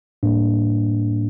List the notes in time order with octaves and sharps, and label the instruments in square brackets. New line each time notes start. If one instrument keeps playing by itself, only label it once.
[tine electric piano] A2 G3 A#3 D4